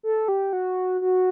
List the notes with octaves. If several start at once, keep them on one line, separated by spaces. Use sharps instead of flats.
A4
G4
F#4
F#4